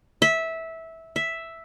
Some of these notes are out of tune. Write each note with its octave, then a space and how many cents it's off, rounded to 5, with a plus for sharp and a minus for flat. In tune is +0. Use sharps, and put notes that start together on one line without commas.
E5 -15
E5 +0